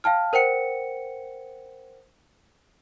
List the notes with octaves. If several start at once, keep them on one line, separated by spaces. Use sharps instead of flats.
F5 G5 A5 F6
A#4 C5 F#5 G5 C#7